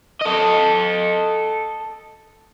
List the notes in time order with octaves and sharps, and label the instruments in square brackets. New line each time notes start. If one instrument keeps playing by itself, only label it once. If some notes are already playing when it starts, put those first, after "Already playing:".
[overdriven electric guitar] A4 D#5